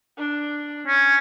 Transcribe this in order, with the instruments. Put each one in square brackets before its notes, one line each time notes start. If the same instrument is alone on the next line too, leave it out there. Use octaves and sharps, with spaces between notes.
[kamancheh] D4
[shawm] C#4